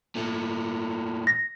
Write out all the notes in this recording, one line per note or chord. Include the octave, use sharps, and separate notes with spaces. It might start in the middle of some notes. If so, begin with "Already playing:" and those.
A#2 A3
A#6